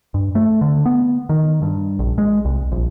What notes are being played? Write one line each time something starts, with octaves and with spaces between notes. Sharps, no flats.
G2
A3
D3
B3
D#3
G2
A#1
G#3
C2
A#1